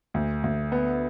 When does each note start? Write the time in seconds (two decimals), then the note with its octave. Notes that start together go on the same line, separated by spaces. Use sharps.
0.14 D2
0.44 D2
0.72 B3